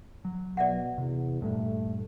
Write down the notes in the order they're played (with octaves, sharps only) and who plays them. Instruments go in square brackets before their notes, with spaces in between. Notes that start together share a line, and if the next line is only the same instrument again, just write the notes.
[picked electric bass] F#3
[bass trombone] B2 [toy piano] D5 E5 F#5
[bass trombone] E2 [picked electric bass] C3
[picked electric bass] G2 A#2 [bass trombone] A3